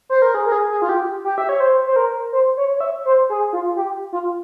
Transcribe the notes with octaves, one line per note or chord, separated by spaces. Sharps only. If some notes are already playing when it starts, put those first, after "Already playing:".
C5
A#4
G#4
A#4
G#4
G#4
F4
G4
G4
E5
C#5
C5
C5
A#4
C5
C#5
C#5
E5
C5
G#4
F4
G4
F4